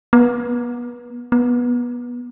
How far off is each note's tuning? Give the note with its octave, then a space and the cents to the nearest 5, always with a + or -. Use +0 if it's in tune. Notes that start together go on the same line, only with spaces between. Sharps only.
B3 -30
B3 -20